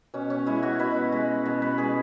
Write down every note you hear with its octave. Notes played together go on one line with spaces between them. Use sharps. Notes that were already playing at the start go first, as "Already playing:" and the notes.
B2 C#4
C#4
G#3 E4
F#4
B2 B4
G#3
B2
B4
G#3 G#4